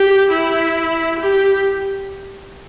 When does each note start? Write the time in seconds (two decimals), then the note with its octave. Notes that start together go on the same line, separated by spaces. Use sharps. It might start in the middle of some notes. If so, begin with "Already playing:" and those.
Already playing: G4
0.31 E4
1.19 G4